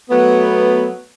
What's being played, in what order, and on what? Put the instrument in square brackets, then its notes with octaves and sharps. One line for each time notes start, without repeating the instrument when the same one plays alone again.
[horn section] F#3 A3 B3